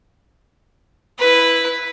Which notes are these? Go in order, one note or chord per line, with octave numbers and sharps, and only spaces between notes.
E4 B4